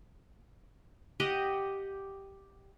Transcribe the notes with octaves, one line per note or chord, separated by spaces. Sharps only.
G4 D#5 F#5